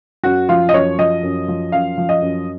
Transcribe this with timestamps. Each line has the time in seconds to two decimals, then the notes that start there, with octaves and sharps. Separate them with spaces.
0.24 F#2 F#4
0.49 F3 F4
0.69 D#5
0.73 F#2 C#5
0.99 F3 D#5
1.23 F#2
1.48 F3
1.72 F#2 F5
1.98 F3
2.09 D#5
2.22 F#2